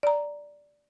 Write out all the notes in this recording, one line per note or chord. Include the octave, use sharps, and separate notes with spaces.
D5 A#5